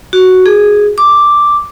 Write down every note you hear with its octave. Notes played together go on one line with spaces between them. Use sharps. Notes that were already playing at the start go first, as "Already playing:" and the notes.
F#4
G#4
D6